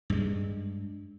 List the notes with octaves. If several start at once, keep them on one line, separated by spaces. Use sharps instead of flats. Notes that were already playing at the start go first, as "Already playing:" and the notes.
G2 G#3